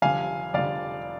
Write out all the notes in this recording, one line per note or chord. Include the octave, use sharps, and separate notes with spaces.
F1 F2 D3 G3 F5 G#5
F1 F2 D3 G3 D5 F5